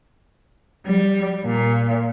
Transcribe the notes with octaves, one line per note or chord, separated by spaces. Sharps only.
G3
A#2